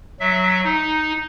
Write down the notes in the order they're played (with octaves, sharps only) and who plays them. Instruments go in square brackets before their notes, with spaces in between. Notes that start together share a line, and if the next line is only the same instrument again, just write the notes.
[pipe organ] F#3 E5
D#4